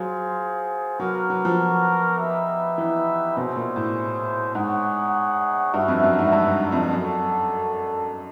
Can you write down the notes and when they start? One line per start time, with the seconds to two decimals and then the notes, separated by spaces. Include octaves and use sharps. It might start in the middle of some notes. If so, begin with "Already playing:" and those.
Already playing: F#3 F4 G#4 C5
0.99 F#3 B3 D4 F#4 A#4
1.30 F#3
1.45 F3
2.18 B3 D#4 G4 B4 E5
2.78 E3
3.36 B2 C#4 E4 G#4 C5
3.56 A#2
3.76 A2
4.55 G#2 D#4 G#4 C#5 F#5
5.73 G2 F#4 B4 E5
5.88 F2
6.03 F#2
6.19 G#2
6.32 G2
6.72 F2
6.92 F#2 D4 F#4 A4